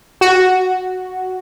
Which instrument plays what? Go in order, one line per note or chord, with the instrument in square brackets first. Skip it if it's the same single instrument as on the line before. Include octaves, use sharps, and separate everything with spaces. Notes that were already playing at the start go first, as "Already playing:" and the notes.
[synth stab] F#4